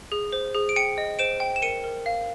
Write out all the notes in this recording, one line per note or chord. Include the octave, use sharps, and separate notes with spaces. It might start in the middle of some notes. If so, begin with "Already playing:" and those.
G#4
C5
G#4
D7
G5 C#7 D#7
D#5
C5 D7 E7
G5
E7
A#4 C#7 D#7
A#4
F5